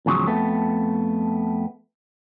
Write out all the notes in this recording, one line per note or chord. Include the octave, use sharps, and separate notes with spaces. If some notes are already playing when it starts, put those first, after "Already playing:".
E2 G#2 C#3 F3 F#3
F2 A3 B3